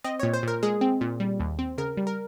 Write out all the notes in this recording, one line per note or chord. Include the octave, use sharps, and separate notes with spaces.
C4 D#5
A#2 C#5
C5
A#2 A#4
G#3 G#4
C4
A#2
G3
D#2
C4
C#3 A#4
G3
A#4